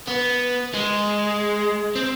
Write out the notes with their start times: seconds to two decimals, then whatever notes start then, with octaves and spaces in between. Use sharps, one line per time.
0.07 B3
0.74 G#3
1.96 C4